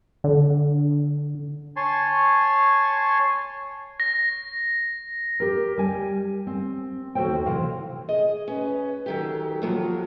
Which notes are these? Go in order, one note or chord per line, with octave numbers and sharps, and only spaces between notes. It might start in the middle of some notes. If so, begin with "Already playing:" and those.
D3
C#5 G#5 A5 C6
A#6
G4 A#4
G3 G#5
C4
D#2 F#4 G4 A4 C5 G5
C3 E3 C5 F5
G#4 D#5
C#4 B4
D#3 F#3 G4 A4
F3 F#3 A#3 F4